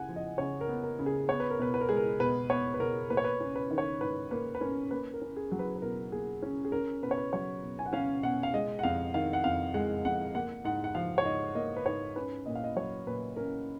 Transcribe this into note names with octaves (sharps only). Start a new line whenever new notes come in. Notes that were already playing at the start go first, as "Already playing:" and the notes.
Already playing: C#3 F#5 G#5
F3
D#5
C#3 C#5
A#4
B3
A#4
C#3
G#4
B3 C#5
B4
A#4
B2 B4
B4
A#4
G#3 G#4
A#4
B2 B4
B3 C#5
B4
B2 A#4
A#3 B4
C#5
B4
C#4
B4
D#3
C#5
G#2 B4
A#3 B4
B4
C#4 A#4
A#3 B4
A#4
C#4
G#4
F#3
B4
B4
B2 A#4
A#3 G#4
C#4
G#4
C#4 A#4
B2 B4
C#5
B4
F#3 C#5
B2
G#5
F#5
C#4 F5
B2 F#5
F5
G#3 D#5
F#5
F2 F5
D#3 F5
F#5
F2 F5
G#3 F#5
F2 F#5
A#3 F#5
G#2 F#5
F#5
F3 F5
C#5
G#2 D#5
A#3 D#5
B4
G#2 C#5
C#4 B4
A#2 D#5
F5
D#5
F#3 C#5
A#2 B4
C#4 A#4